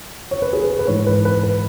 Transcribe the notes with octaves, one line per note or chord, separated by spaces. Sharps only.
C#5
B4
G#4
B4
B4
G#2 E3 C#5
B4
B4
B4